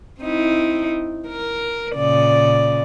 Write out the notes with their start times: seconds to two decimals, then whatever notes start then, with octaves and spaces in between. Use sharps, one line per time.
0.21 C4 D#4 E4
1.28 A#4
1.96 A#2 C#3 D5